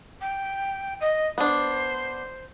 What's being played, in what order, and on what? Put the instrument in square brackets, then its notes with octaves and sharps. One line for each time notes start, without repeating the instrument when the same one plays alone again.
[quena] G5
D#5
[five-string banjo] B3 D4 [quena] C5